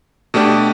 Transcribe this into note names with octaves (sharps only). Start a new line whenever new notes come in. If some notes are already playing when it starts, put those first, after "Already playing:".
B2 A3 D4 G4